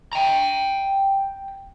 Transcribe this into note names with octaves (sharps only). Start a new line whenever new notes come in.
G5 A#5